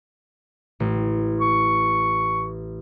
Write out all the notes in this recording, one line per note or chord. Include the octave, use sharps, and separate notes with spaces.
A1
C#6